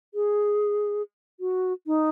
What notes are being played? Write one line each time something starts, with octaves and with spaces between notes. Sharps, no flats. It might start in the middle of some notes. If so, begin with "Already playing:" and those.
G#4
F#4
D#4